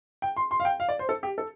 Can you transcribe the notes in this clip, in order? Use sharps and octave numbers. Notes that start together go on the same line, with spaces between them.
G5
C6
C6
F5
G5
F5
D5
C5
A4
G4
A4